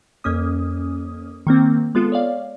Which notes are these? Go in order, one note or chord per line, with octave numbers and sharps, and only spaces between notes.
F2 A#3 C#4 D#6
D#3 A#3 C4
G#3 B3 F4 A4
C#5 D5 F5